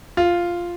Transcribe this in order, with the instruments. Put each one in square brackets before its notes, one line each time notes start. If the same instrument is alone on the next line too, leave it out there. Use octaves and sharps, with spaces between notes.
[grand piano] F4